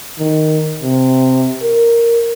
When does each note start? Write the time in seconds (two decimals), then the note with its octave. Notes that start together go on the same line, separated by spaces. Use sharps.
0.19 D#3
0.83 C3
1.63 A#4